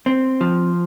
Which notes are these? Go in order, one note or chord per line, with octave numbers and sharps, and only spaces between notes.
C4
F3